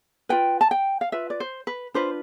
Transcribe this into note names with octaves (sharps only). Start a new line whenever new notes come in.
F4 B4 G5
A5
G5
F5
F4 B4 E5
D5
C5
B4
D4 F4 B4 C5